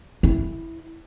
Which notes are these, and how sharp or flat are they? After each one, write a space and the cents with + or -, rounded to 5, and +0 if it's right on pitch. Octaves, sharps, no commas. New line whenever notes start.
E4 -5